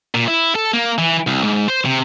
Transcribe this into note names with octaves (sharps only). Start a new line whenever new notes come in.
A#2
E4
A4
A#3
E3
C2
G#2
C5
C3